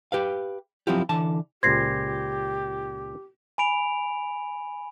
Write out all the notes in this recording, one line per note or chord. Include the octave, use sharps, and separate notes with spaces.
G4 B4 F5
F3 F#3 C4 E4 F4 G4
D3 E3 A5
C#2 A#2 G4 C5 G#6 A#6 C7
G#5 B5 D7 F7